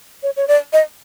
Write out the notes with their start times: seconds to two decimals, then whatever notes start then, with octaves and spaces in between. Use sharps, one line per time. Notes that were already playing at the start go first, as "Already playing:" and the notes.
0.23 C#5
0.37 C#5
0.48 D5
0.73 D#5